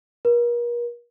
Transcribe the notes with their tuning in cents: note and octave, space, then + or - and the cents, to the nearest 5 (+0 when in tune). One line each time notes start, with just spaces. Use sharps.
A#4 +40